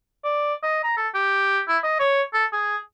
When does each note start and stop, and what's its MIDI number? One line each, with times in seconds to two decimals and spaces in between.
0.24 0.54 74
0.63 0.83 75
0.83 0.95 82
0.97 1.09 69
1.14 1.61 67
1.68 1.78 64
1.84 1.95 75
1.99 2.22 73
2.34 2.45 69
2.53 2.77 68